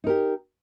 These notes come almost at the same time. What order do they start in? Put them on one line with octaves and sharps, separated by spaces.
D#4 A#4 G4